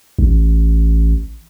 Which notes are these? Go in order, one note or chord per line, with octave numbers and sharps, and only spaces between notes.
A1